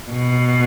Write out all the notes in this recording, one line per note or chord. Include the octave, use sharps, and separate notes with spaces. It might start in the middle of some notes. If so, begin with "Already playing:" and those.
B2